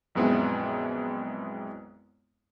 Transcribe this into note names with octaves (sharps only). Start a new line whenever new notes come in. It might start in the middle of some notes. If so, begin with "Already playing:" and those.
A#1 F#2 G#3 B3 C4 E4